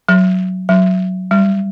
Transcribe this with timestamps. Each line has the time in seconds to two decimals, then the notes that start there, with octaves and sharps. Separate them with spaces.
0.09 F#3
0.69 F#3
1.31 G3